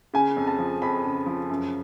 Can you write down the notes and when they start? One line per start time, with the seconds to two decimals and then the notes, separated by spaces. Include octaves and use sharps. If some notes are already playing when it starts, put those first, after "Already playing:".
0.14 C#3 G#5
0.37 F2
0.47 A5
0.59 F3
0.82 F2 B5
1.05 C#3
1.26 F3
1.50 F#2